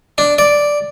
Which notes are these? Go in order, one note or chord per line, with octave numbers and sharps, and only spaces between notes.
D4
D5